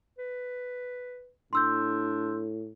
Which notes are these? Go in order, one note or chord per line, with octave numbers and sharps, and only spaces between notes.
B4
A2 D4 C6 E6 G6